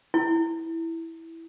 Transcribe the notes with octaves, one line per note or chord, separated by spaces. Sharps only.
E4